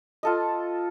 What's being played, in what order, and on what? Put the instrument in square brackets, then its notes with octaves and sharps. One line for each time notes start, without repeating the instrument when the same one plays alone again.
[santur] F4 A4 D#5